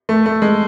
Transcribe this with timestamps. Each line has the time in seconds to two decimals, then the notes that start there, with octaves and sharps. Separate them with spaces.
0.09 A3
0.26 A3
0.42 G#3